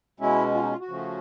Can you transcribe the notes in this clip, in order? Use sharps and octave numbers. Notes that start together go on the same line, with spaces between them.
B2 G#3 C#4 E4
F4
D#4
F4
F#4
C#3 F3 A3 C#4